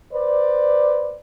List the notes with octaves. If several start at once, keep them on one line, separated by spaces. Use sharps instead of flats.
B4 C5 D5